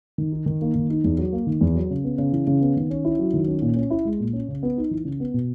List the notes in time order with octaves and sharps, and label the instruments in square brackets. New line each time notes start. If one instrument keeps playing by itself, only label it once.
[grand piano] D#3
D#4
D#3
A#3
D#3
D#4
E2
F#3
A#3
D#3
E2
F#3
C#3
B3
C#3
E3
C#3
B3
D#3
C#4
E4
F#3
D#3
C#4
A#2
C#4
E4
G#3
A#2
C#4
C#3
B3
D#4
E3
C#3
B3
B2